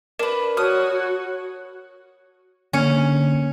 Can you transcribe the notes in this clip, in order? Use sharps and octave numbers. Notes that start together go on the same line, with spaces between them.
D4 A#4 B4 E7
F#4 C#5 D#6 F6
D3 A#3 C#4 C#7